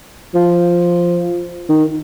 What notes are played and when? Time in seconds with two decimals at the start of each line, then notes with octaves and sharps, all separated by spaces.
0.35 F3
1.69 D#3